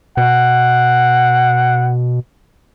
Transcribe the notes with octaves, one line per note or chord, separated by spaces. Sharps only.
B2 F#5